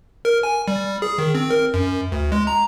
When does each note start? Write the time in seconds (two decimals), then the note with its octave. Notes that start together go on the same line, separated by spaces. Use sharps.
0.25 A#4
0.43 G#5
0.68 G3
1.02 G#4
1.18 D#3
1.35 C4
1.50 A#4
1.74 F#2
2.12 D2
2.32 G#3
2.47 A#5